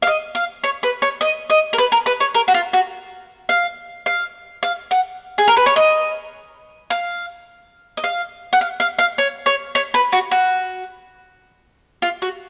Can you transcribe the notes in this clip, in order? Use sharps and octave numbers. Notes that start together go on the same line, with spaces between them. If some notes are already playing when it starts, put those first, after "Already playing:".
F5
D#5
F5
C#5
B4
C#5
D#5
D#5
A#4
B4
A#4
B4
C#5
A#4
F#4
F4
F#4
F5
F5
F5
F#5
G#4
A#4
B4
C#5
D#5
F5
D#5
F5
F#5
F5
F5
F5
C#5
C#5
C#5
B4
F#4
F#4
F4
F#4